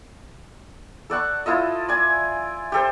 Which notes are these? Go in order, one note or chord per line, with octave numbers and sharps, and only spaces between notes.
A4 D5 F#5 C#6
E4 F4 A4 D#5
D5 G#5
G4 A4 C5